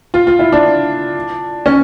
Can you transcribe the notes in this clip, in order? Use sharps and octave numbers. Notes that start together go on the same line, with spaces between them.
F4
F4
E4
D4
C#4